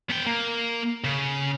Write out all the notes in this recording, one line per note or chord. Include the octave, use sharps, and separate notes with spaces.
B3 G5
A#3
C#3